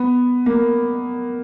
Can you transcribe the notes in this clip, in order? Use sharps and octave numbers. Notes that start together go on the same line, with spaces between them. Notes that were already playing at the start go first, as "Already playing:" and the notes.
Already playing: B3
A#3